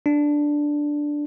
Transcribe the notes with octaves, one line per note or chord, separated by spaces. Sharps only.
D4